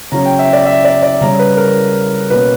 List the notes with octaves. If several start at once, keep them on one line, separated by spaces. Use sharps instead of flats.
C#3 F#3 C#4 A#5
G5
E5
D5
E5
D5
D5
C#3 G3 C#4 A#5
B4
A#4
B2 A#3 C#4 B4